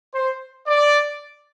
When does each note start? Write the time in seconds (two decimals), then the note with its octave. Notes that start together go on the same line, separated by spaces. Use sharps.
0.14 C5
0.67 D5